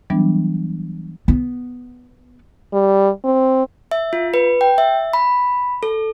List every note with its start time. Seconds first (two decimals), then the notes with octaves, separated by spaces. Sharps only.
0.10 E3 F#3 G3 B3 D4
1.28 B3
2.73 G3
3.24 C4
3.91 E5
4.13 F4
4.34 B4
4.61 G5
4.78 E5
5.13 B5
5.83 A4